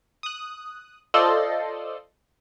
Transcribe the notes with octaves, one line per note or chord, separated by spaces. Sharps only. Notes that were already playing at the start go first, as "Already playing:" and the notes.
D#6 F#6
F4 A4 C5 D5 D#5 C6